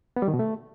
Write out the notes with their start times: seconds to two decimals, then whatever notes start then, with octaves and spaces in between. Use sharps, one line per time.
0.16 B3
0.22 G3
0.28 D#3
0.34 B2
0.39 A3